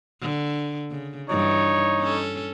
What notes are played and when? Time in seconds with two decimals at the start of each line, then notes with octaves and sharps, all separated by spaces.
0.21 D3
0.91 C#3
1.29 G2 E3 D#4 C#5
2.00 C#4 A4